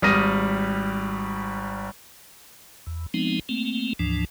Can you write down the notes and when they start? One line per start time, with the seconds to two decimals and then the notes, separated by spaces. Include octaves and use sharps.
0.02 G#1 G3 D#6 F6 A#6 D#7
2.87 E2
3.14 F3 G#3 B3 C4 D#4
3.49 A3 A#3 C4
3.99 D2 G#2 E3 F3 D4